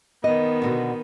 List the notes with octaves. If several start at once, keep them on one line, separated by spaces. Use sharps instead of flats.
D#3 B3 D#5
B2 D3 F#4